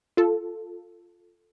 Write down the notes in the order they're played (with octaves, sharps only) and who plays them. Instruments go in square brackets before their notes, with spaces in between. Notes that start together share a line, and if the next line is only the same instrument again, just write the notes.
[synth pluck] F4 A4